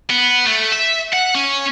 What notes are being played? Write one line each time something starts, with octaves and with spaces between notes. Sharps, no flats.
B3
A3
E5
F#5
C#4